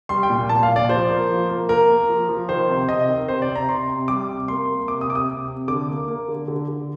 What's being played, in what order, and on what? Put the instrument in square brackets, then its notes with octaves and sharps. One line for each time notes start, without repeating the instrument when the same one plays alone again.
[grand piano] G3 C6
G5
A#2
A#2 A5
F5
A#2
D5
F3 C5
A#3
F3
A#3
A#3 A#4
A#3
F3
F3
D#3 C5
C3
C3 D#5
D#3
C3 C5
D5
C3
A#5
C3 C6
C3
G3 D6
C3
A#3 C6
A#3
C3 D6
D#6
C3 D6
D#6
C3
C3
D3 D6
A#3
A#3
D3
D3
D3